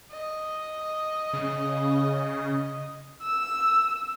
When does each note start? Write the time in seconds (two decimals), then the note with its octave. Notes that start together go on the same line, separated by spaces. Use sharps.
0.11 D#5
1.33 C#3
3.22 E6